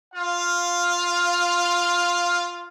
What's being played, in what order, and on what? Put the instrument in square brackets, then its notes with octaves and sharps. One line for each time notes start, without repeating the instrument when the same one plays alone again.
[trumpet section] F4 F5